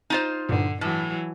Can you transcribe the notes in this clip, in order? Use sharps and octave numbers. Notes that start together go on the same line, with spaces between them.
D#4 F4 C5
G2 A#2 D3
A2 E3 F#3